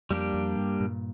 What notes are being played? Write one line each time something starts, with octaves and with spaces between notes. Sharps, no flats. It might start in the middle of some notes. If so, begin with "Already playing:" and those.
F2 G3 A#3 D4 G4
F2
G2
G2 A#2